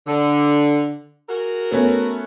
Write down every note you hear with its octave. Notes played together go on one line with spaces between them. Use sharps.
D3
F#4 G#4 A#4
A3 B3 C#4